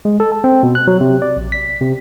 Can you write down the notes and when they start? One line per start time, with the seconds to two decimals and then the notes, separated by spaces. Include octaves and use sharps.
0.05 G#3
0.20 A4
0.32 A5
0.44 C4
0.63 B2
0.75 F#6
0.87 F#3
1.01 C3
1.22 D5
1.37 A#1
1.52 B6
1.81 C3